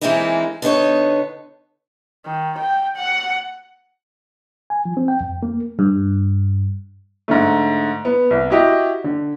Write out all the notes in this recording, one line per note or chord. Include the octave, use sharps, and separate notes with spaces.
E3 G#3 A#3 C4 D#4 E4
D3 B3 D#4 C#5
D#3
G5
F#5
G#5
F3
C4
G5
F2
A#3
G2
G#2 D3 A3
B3
C2
E4 F#4 G4 D#5
D3